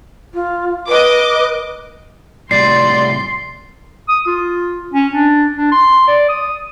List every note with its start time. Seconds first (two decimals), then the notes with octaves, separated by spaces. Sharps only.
0.34 F4
0.89 B4 D#5 D6
2.51 A2 C3 G3 D5 C6 C7
4.08 D#6
4.27 F4
4.94 C#4
5.13 D4
5.57 D4
5.72 C6
6.08 D5
6.29 D#6